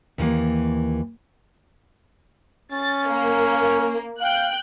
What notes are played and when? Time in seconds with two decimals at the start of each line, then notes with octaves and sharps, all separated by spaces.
0.18 D#2 E3 A#3
2.72 C#4 A6
3.08 A#3
4.21 F5 G5 F#6